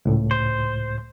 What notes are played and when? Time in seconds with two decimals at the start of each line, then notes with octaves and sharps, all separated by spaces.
0.05 C#2 A2
0.31 C5